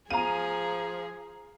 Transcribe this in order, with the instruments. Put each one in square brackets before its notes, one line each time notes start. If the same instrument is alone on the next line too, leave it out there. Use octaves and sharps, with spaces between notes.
[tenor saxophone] F3 [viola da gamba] G#4 [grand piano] F5 G#5 [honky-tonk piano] A#5 D#7